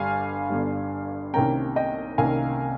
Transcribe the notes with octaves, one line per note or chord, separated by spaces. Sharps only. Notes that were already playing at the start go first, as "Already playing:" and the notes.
Already playing: G1 G2 G3 F5 G#5
G1 G2 G3
C2 C3 D#3 A#3 C#4 G5 A#5
D#5 G5
C2 C3 D#3 A#3 C#4 F5 G#5